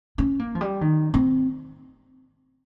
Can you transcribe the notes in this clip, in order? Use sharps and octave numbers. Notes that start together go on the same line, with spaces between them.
C#4
A#3
F3
G3
D#3
C4